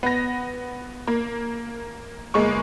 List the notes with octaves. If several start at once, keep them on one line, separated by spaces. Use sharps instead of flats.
B3 A#6
A#3
G1 G#3 A#3 C#6